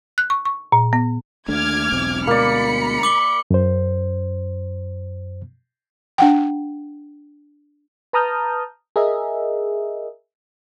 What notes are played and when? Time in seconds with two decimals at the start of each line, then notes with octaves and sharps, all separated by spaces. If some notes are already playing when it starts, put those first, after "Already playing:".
0.18 F#6
0.30 C#6
0.45 C#6
0.72 A#2
0.93 B3
1.48 D#2 A3 D4 D6 F6 G#6
1.92 E1 B1 C4
2.27 D2 B2 G#3 A#3 D5 B5 C#7
3.03 D6 F#7 G7
3.51 F#2 C5
6.18 D4 F#5 G5
8.13 B4 A5 A#5 D#6 F6 G6
8.96 G#4 A#4 D#5 E5